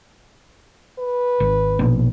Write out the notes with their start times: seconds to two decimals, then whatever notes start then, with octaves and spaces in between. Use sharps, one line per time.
0.99 B4
1.40 G#1
1.79 A#1 B2